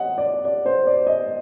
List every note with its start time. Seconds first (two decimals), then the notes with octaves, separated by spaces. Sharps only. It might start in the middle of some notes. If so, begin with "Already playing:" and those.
Already playing: D#5 F#5
0.18 D5
0.45 D5
0.66 C5
0.87 D5
1.07 D#5